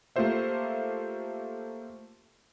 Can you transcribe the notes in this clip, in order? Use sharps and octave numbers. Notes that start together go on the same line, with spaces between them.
A3 A#3 F4 G4 C5 E5